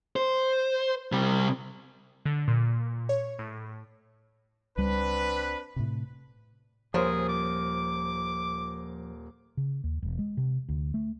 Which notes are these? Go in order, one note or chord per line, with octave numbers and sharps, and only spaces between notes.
C5
C3 G3
D3
A#2
C#5
A2
C#2 G3 C4 D4 B4
A2 C3
D#1 F3 A#3 G#4 A#4 C5 C#5
D6
C#3
D#2
E1
G#3
C3
D2
A3